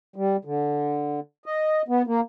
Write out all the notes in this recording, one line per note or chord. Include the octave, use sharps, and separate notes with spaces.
G3
D3
D#5
B3
A#3